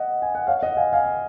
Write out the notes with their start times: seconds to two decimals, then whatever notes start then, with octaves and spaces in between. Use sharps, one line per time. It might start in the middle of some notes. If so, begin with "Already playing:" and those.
Already playing: D#5 F#5
0.22 G#5
0.35 F#5
0.47 C#5 F5
0.63 D#5 F#5
0.77 F5 G#5
0.93 F5 G#5